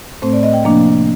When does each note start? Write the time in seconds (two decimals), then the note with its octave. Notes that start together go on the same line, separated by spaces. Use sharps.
0.22 A2 A3 C4 C5
0.33 D5
0.43 D#5
0.53 G5
0.64 C3 F3 A#3 D4